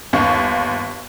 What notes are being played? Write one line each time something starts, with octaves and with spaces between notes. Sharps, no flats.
G1 D#2 C#6